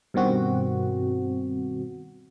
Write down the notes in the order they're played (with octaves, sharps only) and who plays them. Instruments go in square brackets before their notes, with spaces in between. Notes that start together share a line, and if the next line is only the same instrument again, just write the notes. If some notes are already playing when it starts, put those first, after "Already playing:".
[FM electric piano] G2 B2 D#3 C4 F#4